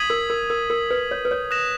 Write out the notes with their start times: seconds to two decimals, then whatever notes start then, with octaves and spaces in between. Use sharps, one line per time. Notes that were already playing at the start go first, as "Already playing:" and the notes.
Already playing: D#6 G#6 B6 D#7 F#7
0.10 A#4
0.30 A#4
0.50 A#4
0.70 A#4
0.91 B4
1.11 C#5
1.25 B4
1.31 C#5
1.51 D#6 F#6 A#6 E7